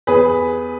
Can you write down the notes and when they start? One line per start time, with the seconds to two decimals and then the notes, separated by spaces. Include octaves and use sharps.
0.07 E2 G#4 B4